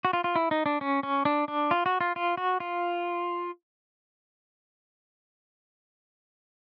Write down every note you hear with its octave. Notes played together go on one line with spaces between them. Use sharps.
F#4
F4
F4
E4
D#4
D4
C#4
C#4
D4
D4
F4
F#4
F4
F4
F#4
F4